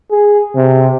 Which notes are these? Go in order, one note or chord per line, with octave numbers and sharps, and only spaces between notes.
G#4
C3